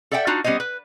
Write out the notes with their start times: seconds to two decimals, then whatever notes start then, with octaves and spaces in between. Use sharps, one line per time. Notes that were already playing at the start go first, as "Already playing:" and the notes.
0.11 A4 D5 E5 F#5 G5
0.27 D4 D#4 F4 F#4
0.44 G3 B3 C#4 C5 D#5
0.60 B4